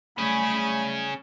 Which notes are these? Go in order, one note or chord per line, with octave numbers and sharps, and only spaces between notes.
F#3 G3 A3 C#4 G#4 B5